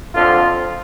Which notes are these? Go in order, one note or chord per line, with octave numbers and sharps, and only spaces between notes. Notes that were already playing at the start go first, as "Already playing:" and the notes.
F2 D3 F3 F4